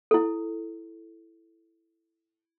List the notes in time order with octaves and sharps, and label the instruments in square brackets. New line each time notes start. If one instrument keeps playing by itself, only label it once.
[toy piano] E4 A4